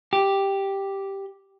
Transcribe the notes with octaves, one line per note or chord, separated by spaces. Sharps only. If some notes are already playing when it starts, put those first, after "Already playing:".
G4